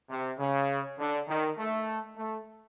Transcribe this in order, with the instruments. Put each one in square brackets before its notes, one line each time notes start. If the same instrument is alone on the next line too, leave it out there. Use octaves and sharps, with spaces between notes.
[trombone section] C3
C#3
D3
D#3
A3
A3